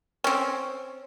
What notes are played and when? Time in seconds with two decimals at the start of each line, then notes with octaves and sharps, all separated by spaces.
0.24 C4 C#4